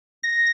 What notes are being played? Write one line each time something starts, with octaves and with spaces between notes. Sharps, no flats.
A#6